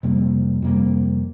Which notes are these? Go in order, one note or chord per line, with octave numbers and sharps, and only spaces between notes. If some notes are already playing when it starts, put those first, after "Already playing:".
F2 C3 G3 A#3
F2 C3 G3 A#3